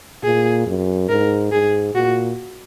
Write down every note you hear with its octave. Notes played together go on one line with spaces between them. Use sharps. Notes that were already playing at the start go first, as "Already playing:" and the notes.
A#2 G#4
F#2
G#2 A#4
G#2 G#4
A#2 F#4